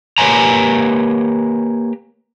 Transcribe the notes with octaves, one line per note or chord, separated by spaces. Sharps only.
A#3 G4 B4 C#5 G#5 A#5